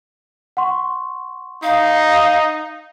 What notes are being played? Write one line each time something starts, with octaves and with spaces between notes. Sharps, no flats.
F#5 C6 C#6
D#4 F5